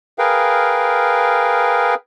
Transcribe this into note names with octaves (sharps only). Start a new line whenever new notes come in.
G#4 A#4 B4 F5 G5